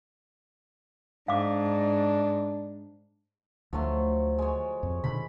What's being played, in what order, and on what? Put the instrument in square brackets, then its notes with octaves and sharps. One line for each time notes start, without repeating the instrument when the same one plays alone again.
[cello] G#2 [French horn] D4 [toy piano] F5 D6
[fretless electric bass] D2 [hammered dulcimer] F3 F#3 A3
[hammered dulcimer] G#3 C#5
[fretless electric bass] F2
[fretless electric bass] B2 D3 D#3 [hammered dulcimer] B5